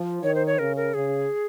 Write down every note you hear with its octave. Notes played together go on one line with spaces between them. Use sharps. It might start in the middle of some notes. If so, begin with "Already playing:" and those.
Already playing: F3
D#3 C#5
C5
C#5
C#3 A#4
A#4
C#3 G#4